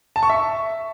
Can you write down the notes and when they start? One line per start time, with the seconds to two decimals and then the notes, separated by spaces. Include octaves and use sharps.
0.16 A5
0.23 C#6
0.30 E5